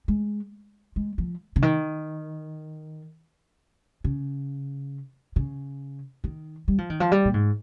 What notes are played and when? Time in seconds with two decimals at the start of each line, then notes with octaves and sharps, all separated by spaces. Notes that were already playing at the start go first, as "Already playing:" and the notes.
0.08 G#3
0.96 G#3
1.18 F3
1.56 C#3
1.62 D#3
4.04 C#3
5.36 C#3
6.24 D#3
6.68 G3
6.78 F3
6.90 D#3
7.00 F3
7.12 G3
7.25 A#2
7.34 G#2